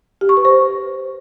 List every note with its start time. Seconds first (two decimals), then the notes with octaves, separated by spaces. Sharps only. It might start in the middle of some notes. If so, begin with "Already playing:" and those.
0.21 G4
0.29 C#6
0.37 B4
0.45 C5